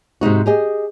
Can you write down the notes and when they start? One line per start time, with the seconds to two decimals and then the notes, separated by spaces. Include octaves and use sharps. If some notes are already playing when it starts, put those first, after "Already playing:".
0.21 G#2 C3 D#4 F#4
0.46 G4 G#4 D#5